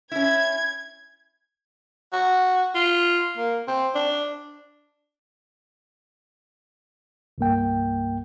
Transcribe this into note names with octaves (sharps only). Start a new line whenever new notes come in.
C#4 E4 G#6
F#4
F4
A#3
C4
D4
C2 G2 A#3 G5